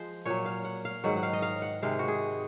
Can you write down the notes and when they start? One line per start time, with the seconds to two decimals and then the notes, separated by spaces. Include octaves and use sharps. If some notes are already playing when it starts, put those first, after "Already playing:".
Already playing: F3 G#3 C5
0.25 A#2 F#3 C#5
0.46 F5
0.65 F#5
0.85 F5
1.04 G#2 D#3 F#3 F#5
1.17 F#5
1.23 F5
1.33 D#5
1.42 F5
1.62 F#5
1.83 C3 D#3 G#3 F5
1.99 F#4
2.08 G#4